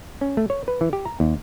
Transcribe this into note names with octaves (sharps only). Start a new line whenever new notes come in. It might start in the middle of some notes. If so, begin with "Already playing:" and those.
C#4
A3
C#5
B4
E3
G4
A#5
D#2